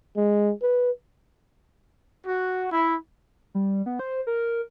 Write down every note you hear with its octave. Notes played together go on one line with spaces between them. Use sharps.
G#3
B4
F#4
E4
G3
B3
C5
A#4